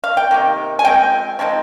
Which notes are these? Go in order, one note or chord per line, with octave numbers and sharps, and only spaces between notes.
F5
G5
C3 D#3 A#3
G#5
F3 G#3 C4 G5
F3 G#3 C4 D#4